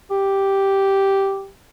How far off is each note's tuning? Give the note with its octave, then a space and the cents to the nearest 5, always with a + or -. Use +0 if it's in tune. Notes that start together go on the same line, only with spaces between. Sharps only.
G4 -5